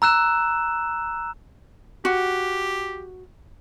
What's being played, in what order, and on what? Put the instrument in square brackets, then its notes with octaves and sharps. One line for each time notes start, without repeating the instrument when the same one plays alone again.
[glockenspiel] A#5 E6 F#6 E7
[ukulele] F#4 [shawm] G4